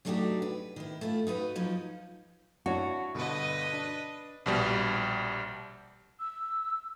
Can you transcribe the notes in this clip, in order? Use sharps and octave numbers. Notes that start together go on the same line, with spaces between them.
F#3 A3 D4 D#4 F#4 G4
B4
D#3 E4
A3 E4 F4
D#4 F#4 B4
F3 F#3 D#4
D4 E4 F#4 C#5
G2 B2 D3 B4 D#5
D4
A#1 B2 G3
E6